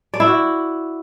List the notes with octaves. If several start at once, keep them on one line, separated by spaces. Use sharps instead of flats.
D5
E4
F#4